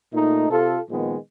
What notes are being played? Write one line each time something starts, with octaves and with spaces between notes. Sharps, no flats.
A#2 A3 D#4
C3 F4 A4
A#2 D#3 F3 G#3 B3